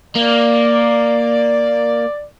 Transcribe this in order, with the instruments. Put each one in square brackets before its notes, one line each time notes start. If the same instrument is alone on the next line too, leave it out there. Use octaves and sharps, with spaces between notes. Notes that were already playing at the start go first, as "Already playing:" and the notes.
[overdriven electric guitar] A#3 [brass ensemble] D5